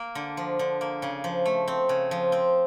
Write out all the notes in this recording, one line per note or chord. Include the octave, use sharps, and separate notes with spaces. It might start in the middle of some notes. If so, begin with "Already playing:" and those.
Already playing: A#3
D3
F3
D3
A#3
C#3
F3
A3
C4
C#3
F3
C4